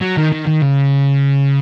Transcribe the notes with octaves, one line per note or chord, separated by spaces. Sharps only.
F#3
D#3
D#3
D#3
C#3